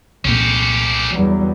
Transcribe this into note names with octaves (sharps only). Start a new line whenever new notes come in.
C2 A#2 C#4 G4
E2 F#3 G3